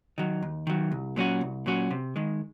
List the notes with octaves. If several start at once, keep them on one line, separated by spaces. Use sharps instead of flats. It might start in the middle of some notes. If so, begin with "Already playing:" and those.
D#3 F#3
D#2
D#3 F#3
C2
A#2 F#3 C#4 F#4
C2
A#2 F#3 C#4 F#4
C3
D#3 G#3